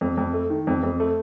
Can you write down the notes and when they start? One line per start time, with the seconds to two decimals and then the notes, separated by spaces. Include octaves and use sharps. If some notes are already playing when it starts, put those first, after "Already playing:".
0.01 F2
0.17 F2
0.33 A3
0.50 D#3
0.67 F2
0.83 F2
1.00 A3